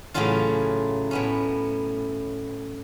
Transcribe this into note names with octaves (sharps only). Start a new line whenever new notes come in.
A2 C#3 E3 F#3 C#4 F4
A2 B3 C#4